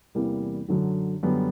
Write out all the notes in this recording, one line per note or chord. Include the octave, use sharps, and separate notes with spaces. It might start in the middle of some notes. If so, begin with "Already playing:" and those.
E2 C3 E3 G3 A#3
F#2 D3 F#3
F#2 D3 G3 B3